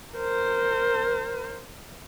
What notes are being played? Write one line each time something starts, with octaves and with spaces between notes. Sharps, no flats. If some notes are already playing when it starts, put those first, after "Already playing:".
A#4 C5